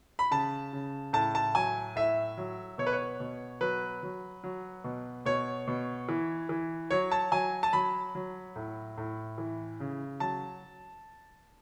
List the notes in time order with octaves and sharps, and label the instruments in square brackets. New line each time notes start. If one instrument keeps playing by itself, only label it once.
[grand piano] B5
C#3 A5
C#3
A2 A5
A5
F#3 G#5
A2 E5
F#3
B2 C#5
B4
C#5
B2
F#3 B4
F#3
F#3
B2
B2 C#5
B2
E3
E3
F#3 C#5
A5
F#3 G#5
A5
F#3 B5
F#3
A2
A2
E3
C#3
F#3 A5